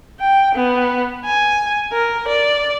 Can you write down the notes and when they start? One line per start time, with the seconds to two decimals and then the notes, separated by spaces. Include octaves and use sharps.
0.20 G5
0.55 B3
1.25 G#5
1.93 A#4
2.28 D5